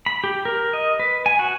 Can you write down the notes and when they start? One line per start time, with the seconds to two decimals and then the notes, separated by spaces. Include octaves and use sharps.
0.06 B5
0.24 G4
0.45 A#4
0.73 D#5
1.00 B4
1.26 G#5
1.39 F#4